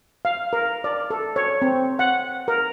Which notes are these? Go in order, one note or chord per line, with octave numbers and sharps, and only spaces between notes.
F5
A#4
D5
A4
C#5
C4
F#5
A#4